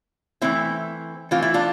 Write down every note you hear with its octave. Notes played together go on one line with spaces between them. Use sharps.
E3 A3 C4 E4
E3 A3 C4 F4
E4
D4 F4